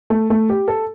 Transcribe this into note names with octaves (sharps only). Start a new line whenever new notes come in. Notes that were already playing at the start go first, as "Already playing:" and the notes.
A3
A3
G4
A4